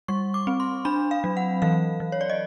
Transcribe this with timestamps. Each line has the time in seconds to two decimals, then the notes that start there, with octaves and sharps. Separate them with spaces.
0.08 G3 C#6
0.34 D6
0.47 C4
0.60 C6
0.85 D4 B5
1.11 F5
1.24 F#3
1.37 F#5
1.62 E3 F5
2.00 E3
2.12 C#5
2.21 D5
2.30 D#5